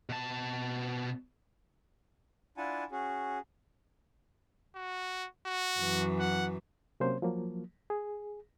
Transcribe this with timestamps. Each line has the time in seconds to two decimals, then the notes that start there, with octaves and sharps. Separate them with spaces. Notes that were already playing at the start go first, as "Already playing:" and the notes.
0.09 B2 A5
2.57 D4 E4 F4 F#5 G#5 A5
2.92 C#4 F#4 G#4
4.76 F#4
5.47 F#4
5.80 F#2 E3
6.19 F#5
7.00 C3 F#3 A#3 C#4 C5
7.22 F3 F#3 A#3
7.90 G#4